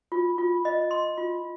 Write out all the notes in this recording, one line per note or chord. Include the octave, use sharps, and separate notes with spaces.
F4
F4
D#5
C6
F4